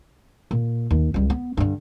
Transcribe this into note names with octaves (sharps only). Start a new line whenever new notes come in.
A#2
D#2
C#2 G3
B3
G2 D3